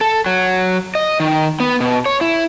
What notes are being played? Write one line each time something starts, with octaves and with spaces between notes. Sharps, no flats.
A4
F#3
D#5
D#3
B3
B2
C#5
E4